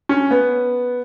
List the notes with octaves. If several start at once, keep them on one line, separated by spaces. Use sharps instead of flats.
C#4
B3